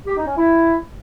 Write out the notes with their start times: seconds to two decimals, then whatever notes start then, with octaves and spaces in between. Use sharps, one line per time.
0.06 G4
0.16 D#4
0.26 C#4
0.36 E4